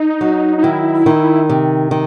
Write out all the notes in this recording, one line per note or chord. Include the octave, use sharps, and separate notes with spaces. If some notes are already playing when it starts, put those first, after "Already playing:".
Already playing: D#4
F#3
D#4
D#3 E4
D#3
C3
D#3